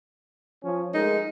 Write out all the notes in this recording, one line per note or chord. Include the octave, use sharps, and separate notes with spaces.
F3 C#4
G#3 A3 D#4 A#4